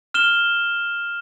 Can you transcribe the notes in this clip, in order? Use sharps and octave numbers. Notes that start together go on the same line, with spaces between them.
F6 E7 G7